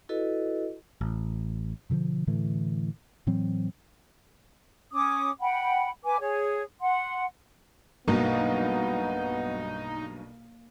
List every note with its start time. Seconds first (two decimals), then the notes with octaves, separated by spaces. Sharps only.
0.09 E4 F#4 A4 B4 D#5
1.01 A1
1.90 B2 D3 D#3 F3
2.27 A2 D3 E3 A3
3.27 A2 E3 F#3 C4
4.93 C#4 D6 D#6
5.41 F#5 G5 B5
6.04 B4 G#5 D6
6.20 G#4 C#5
6.81 F#5 C6
8.08 B1 G2 B2 A#3 B3 D#4